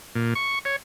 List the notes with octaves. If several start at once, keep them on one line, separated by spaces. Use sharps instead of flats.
A#2
C#6
C#5